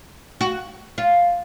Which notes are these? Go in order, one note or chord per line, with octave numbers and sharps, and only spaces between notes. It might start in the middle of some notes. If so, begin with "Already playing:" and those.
F#4
F4